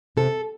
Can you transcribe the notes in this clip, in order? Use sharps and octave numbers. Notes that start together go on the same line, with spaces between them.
C3 A4